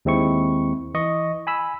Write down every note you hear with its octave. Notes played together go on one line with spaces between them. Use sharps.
D#2 G#3 C4 E4 C#6
E3 D#5 C#6
G#5 B5 E6